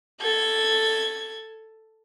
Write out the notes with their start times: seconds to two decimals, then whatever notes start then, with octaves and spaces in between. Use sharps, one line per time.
0.21 A4 G#6